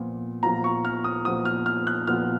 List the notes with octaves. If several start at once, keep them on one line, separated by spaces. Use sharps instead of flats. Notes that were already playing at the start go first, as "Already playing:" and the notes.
Already playing: A#2 F3 B3 F4
A#2 F3 B3 F4 A#5
C#6
F6
D#6
A#2 F3 B3 F4 D#6
F6
F6
F#6
A#2 F3 B3 F4 F6